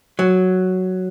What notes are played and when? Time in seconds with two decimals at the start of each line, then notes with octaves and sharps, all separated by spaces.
0.19 F#3